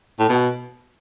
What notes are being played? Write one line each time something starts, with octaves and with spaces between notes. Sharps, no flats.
A2
B2